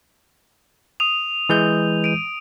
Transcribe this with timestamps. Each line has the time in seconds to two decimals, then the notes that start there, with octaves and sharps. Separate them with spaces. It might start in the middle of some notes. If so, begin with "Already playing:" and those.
1.00 D#6 D#7 F7
1.49 E3 G#3 G6
2.04 D7 D#7